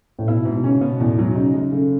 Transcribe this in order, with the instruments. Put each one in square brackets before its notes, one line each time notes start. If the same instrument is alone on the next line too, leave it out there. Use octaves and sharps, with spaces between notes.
[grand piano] A2
[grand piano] B2 [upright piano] E4
[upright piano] G#2 [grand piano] B2
[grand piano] B2
[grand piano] C#3 [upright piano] C#4
[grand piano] B2 [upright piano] B3
[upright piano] E2 [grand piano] A2
[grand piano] B2 [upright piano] F#3
[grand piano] C#3 [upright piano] D#4
[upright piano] F#2 [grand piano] C#3
[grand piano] C#3 [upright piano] A3